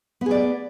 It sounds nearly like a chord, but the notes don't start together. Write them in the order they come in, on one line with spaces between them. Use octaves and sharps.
B3 G#4 D5